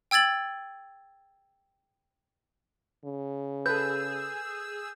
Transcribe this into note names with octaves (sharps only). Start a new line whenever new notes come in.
G5 E6 G#6 A6 F#7
C#3
G#4 A4 B4 E6 G6